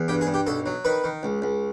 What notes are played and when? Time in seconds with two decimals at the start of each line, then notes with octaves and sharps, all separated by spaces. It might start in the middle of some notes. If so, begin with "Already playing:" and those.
Already playing: E2
0.08 G2 G4
0.21 G#4
0.27 G2
0.34 G4
0.47 B1 A4
0.66 F#3
0.85 D#3 B4
1.04 D#3
1.23 C#2
1.42 C#2